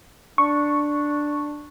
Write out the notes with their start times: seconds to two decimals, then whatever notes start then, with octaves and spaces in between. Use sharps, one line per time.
0.38 D4 C#6